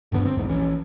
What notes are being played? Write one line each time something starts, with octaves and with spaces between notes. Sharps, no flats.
E1 G2 D3 B3
C4
B1 E2 G#2
A#1 E3 C#4